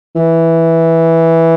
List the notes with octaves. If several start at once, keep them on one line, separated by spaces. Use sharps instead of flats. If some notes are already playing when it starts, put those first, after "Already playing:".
E3